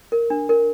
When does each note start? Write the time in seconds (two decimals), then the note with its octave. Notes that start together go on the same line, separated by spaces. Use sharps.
0.12 A#4
0.30 D4
0.49 A#4